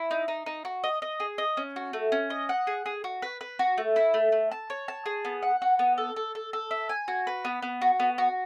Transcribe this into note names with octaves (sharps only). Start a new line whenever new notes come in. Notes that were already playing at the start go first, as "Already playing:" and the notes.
Already playing: E4
D#4
D#4
D#4
F#4
D#5
D#5
G#4
D#5
C#4
F#4
A3
C#4
D#5
F#5
G#4
G#4
F#4
B4
B4
F#4
A3
E4
A3
A3
A5
C#5
A5
G#4
B3
F#5
F#4
B3
A4
A4
A4
A4
E5
G#5
F#4
B4
B3
B3
F#4
B3
F#4